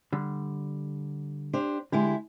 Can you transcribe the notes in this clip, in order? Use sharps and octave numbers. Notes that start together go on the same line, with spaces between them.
D3 G3
D4 G4 C5
D3 G#3 E4 G4